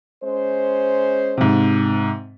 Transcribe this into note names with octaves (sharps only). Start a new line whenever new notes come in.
G#3 C#4 C5
G#2 C3